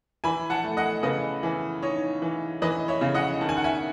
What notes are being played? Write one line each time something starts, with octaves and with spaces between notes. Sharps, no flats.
E3 G#5 B5
F#5 A5
A3
D#5 F#5
C#3 B4 D#5
E3
D#4 C#5
E3
E3 B4 D#5
C#5 E5
C#3
D#5 F#5
D#3 A5
G#5
F#5
E5 G#5